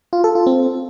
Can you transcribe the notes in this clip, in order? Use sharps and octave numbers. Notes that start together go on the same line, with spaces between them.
F4
A4
F4
C4